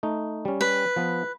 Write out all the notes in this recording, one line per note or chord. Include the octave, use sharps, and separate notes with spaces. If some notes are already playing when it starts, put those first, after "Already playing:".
A3 D#4
G3 C#4
B4
F3 B3